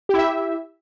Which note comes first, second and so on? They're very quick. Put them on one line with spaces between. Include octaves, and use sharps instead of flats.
G4 E4 E5